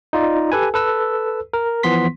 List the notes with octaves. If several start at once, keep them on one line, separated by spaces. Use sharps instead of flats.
D#4 F4 D5
G4 A4 B4 G#5
A4 B4 E6
A#4
E3 F3 B3 C6 B6